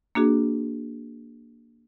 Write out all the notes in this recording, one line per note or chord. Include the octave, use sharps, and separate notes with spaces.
A#3 D4 F#4 G#4